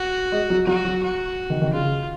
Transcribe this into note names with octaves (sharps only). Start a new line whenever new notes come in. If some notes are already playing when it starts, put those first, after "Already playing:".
Already playing: F#4
G#3
F#3
F#3 F#4
F#3
F#4
D#3
D#3
C#3 F4